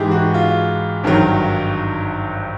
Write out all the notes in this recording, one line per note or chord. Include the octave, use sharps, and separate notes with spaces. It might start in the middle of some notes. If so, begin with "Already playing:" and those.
Already playing: G#2 E3 G#3 G4 G#4
F#4
F4
G#1 G2 D#3 F#3